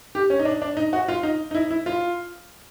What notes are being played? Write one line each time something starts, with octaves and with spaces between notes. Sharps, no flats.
G4
C#4
D#4
D4
D4
D#4
F#4
F4
D#4
D#4
E4
E4
F4